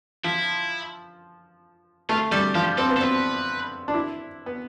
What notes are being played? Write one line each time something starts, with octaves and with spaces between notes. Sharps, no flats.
F3 E4
A3 F4
G3 A4
F3 G4
C4 A4
B3
A4
C4 B4
D4
E4
B3